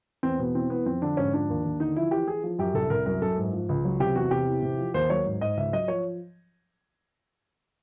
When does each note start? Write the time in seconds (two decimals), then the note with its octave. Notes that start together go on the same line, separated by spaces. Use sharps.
0.23 E2 C4
0.39 B2 B3
0.55 E3 C4
0.70 E3 B3
0.86 F2 C4
1.02 D3 D4
1.17 G#2 C#4
1.33 F3 D4
1.50 D#2
1.64 D#2
1.80 D3 D#4
1.96 F3 E4
2.11 E3 G4
2.27 E3 G#4
2.44 F3
2.59 F#2 G4
2.74 C2 A4
2.90 C2 A#4
3.06 F#2 A#4
3.22 F#2 A4
3.37 G#2
3.53 F3
3.69 C#2
3.85 F#3
4.00 C3 G4
4.16 E2 F#4
4.31 C3 G4
4.47 E3
4.62 C3
4.78 F3
4.94 D#2 C5
5.10 F#3 C#5
5.26 G#2
5.41 G#2 D#5
5.57 C#2 E5
5.72 F#3 D#5
5.88 F3 C#5